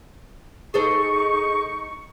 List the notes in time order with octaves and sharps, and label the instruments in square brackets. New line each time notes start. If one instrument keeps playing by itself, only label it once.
[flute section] D#4 C#6 [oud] G#4 A4 C5